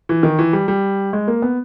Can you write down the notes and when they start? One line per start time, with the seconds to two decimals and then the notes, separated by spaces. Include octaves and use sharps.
0.09 E3
0.23 D#3
0.39 E3
0.53 G3
0.68 G3
1.13 G#3
1.28 A#3
1.42 B3